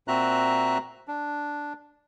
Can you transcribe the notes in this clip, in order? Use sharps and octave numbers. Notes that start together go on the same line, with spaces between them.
A#2 C4 F#4 E5 A#5 F#6
D4